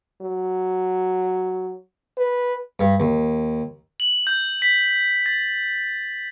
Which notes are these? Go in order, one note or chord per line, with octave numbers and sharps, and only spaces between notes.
F#3
B4
G2
D#2
F#7
G6
B6
A6